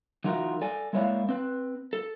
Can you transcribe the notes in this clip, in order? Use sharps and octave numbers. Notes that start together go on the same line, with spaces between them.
E3 D#4 F4 F#4 A#4
A4 D5 G#5
G#3 A#3 E4 C#5 D5 F5
C4 B4
A4